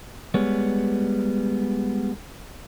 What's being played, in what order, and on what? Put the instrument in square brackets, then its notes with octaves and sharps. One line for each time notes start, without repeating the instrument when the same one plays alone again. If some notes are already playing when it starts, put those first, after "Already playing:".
[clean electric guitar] G3 G#3 B3 C#5